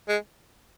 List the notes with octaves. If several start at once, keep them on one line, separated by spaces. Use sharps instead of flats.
G#3